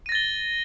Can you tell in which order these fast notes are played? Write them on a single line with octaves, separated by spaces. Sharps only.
D#7 A#6 A6 G7